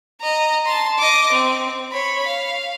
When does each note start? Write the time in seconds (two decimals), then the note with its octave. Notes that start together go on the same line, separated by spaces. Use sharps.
0.21 D#5 A#5
0.66 A5 C6
0.98 D#5 D6
1.32 C4
1.92 C#5 B5
2.26 F5